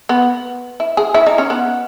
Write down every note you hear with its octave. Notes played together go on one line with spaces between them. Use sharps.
B3
E4
G#4
E4
D#4
C#4
B3